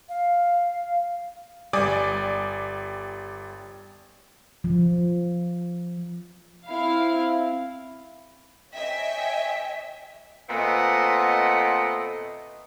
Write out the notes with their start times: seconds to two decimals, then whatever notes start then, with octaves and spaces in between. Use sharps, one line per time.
0.09 F5
1.73 G1 G3 D5 G#5 D6 D#6
4.64 F3
6.68 C4 E4 F5
8.73 C#5 D#5 E5 G5 G#5
10.48 A#2 A3 B3 C4 D#5 F#5